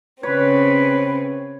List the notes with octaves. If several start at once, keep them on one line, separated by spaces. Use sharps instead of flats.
C#3 C4 B4 C#5